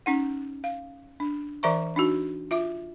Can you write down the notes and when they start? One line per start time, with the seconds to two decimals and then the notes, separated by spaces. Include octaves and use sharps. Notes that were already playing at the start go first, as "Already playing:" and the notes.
0.06 C#4 D#4 F#5
0.64 F5
1.20 D4
1.63 E3 A#4 D5 E5 A#5 C#6
1.96 D4 D#4 F#4
2.51 F4 E5 D6